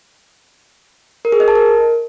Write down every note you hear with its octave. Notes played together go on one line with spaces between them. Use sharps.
A#4
G#4
D#5
A5
A#4